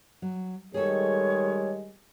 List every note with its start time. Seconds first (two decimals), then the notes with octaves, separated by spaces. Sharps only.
0.22 F#3
0.74 D#3 G3 G#3 G#4 A4 C#5